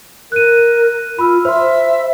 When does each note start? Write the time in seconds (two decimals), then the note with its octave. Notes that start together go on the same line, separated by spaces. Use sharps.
0.32 A#4 F#6 D#7
1.19 F4 B5 E6 F6
1.45 C5 E5 C6